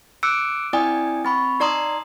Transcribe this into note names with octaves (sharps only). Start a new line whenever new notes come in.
D6 E6 F#6 C#7 D7
C4 E4 D5 G5 G#5 D#6
C4 B5 C#6
D#4 D5 A#5 C6 D#6